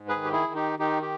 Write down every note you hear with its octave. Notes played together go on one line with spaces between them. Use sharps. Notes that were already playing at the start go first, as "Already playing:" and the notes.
Already playing: G#2
G#4 B4
D#3
G4
E4 G#4
D#3
D#4 G4
D#3 D#4 G4
G4